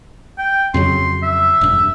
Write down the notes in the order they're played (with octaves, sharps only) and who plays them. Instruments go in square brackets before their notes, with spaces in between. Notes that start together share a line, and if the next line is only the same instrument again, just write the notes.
[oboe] G5
[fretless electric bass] F2 C#3 F#3 [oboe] C6
[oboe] E5
[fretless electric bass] E1 G2